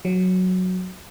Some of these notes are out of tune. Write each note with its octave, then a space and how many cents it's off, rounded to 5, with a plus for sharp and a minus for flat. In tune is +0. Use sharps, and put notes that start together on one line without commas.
F#3 -5